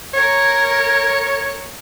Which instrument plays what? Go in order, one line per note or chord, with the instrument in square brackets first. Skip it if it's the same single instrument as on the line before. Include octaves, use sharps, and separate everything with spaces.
[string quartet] A#4 [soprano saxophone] C#5 [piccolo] G#6